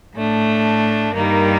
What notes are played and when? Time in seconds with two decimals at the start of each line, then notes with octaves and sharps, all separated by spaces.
0.16 A2 A3 D4
1.15 G2 D#3 G3 A#3 D#4